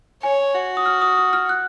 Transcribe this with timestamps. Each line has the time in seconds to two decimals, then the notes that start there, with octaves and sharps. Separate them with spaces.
0.23 C#5 G#5
0.54 F#4
0.77 D#6
0.86 F6
1.02 D#6
1.17 D#6
1.33 F6
1.49 F#6